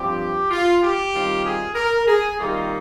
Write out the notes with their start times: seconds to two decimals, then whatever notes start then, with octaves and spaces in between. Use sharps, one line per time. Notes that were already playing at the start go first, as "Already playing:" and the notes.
Already playing: G2 F3 C4 G4
0.50 F4
0.81 G4
1.13 D#3 G3 C4 F4
1.44 G#4
1.75 A#4
2.07 G#4
2.38 C3 D#3 G3 A#3 D#4 F4